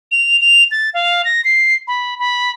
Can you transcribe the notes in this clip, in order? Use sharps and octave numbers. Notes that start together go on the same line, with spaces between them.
F7
F7
A6
F5
A#6
C7
B5
B5